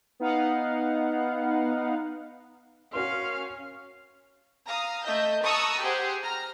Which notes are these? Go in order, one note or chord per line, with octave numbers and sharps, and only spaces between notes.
B3 D#4 F5 F#5
C#4 F#4 A#4 F5 C6
F5 A#5 D#6
A3 D#5 E5 G6
A5 A#5 C#6 D#6 E6 F#6
G4 G#4 C5 F#5
A#5 F6